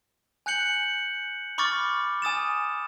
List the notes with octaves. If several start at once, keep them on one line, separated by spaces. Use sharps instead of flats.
G#5 F#6 G6 C#7 F#7
B5 C#6 D6 F6 A6
G#5 D#6 A6 E7